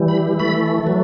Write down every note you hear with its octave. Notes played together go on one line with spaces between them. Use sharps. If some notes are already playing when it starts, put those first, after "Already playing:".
Already playing: E3 G3
B5
A3 B5
F#3